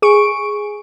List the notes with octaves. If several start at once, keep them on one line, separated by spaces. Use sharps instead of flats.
G#4 C#6 D7